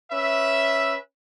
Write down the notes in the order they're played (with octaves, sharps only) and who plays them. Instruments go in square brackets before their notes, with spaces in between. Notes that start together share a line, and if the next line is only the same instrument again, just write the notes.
[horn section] C#4 B4 E5